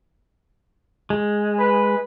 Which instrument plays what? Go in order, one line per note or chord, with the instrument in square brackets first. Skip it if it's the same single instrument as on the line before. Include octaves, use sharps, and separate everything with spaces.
[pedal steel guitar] G#3
[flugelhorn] B4